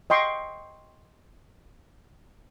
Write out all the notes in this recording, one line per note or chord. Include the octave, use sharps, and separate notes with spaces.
D#5 G5 C6 C#6